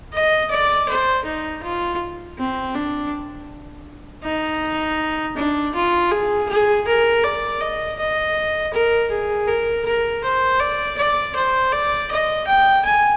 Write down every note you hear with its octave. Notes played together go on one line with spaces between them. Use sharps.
D#5
D5
C5
D#4
F4
C4
D4
D#4
D4
F4
G#4
G#4
A#4
D5
D#5
D#5
A#4
G#4
A#4
A#4
C5
D5
D5
C5
D5
D#5
G5
G#5